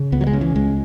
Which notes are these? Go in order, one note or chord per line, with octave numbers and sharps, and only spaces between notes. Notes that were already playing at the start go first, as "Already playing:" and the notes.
Already playing: C#3
C#2 B3
F#3
G#3
C#3
E3
C#2 G#3